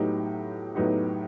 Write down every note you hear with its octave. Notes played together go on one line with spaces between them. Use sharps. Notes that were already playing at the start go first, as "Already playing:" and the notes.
Already playing: A2 F#3 B3 D#4 G4
A2 F#3 B3 D#4 G4